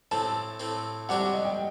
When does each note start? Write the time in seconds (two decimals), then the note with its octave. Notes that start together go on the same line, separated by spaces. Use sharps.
0.11 A2 A3 C4 A5
0.60 A2 A3 C4
1.09 C3 G3 D4 F#4 F#5
1.21 F#5
1.34 D#5
1.45 G5